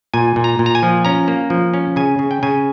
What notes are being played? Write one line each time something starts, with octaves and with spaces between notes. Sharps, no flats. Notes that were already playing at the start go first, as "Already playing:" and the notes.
A#2 G#5
A#2
A#5
A#2
A#5
G#5
F3
C#4 A#5
A#3
F3
C#4
C#3 G#5
C#3
G5
C#3 G#5